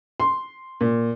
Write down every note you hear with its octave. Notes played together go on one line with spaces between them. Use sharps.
C6
A#2